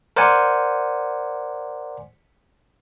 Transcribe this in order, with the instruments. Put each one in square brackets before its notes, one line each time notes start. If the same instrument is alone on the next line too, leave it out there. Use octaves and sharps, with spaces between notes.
[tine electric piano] A#4 C5 D5 F#5 G#5